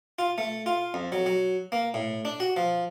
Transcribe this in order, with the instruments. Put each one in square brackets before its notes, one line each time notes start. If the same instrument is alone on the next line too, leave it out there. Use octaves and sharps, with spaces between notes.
[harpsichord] F4
A3
F4
F2
F#3
F#3
A#3
A2
D4
F#4
F3